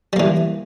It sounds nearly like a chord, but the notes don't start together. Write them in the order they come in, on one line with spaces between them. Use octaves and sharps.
G3 A#3 E3